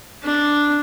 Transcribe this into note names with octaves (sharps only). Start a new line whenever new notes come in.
D4